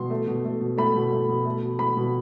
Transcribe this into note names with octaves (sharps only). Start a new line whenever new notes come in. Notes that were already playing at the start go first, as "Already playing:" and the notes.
Already playing: B2 C6
A3
B2
A3
B2
A3 B5
B2
A3
B2
A3
B2
A3 B5
B2